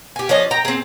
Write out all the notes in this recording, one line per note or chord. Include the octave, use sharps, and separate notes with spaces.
G4 G#5
F3 C#4 D4 D#5
G5 A#5
C4 G#4